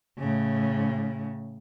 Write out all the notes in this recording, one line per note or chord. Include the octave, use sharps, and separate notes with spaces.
A2 C#3